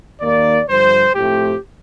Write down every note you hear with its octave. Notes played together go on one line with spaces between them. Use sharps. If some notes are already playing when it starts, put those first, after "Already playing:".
D#2 D#3 A#3 D5
G2 D3 F3 C5
A2 F3 A3 C4 G4